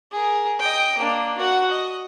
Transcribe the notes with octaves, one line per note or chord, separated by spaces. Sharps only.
G#4 A#4
D#5 G5
A#3 D4
F#4 F#5
D#5